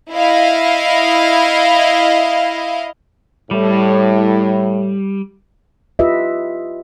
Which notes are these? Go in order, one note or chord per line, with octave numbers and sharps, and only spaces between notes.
E4 D#5 F5
A2 G3
F4 G4 B4 D#5 E5